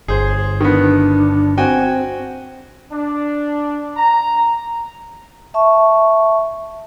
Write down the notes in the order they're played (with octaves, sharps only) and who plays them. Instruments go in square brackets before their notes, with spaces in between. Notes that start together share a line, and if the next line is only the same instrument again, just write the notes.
[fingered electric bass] G1 [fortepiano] G#4 C5
[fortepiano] D#3 B3 [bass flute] D4
[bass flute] C4 [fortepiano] F#4 G5 G#5
[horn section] D4
A#5
[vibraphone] E5 A5 C#6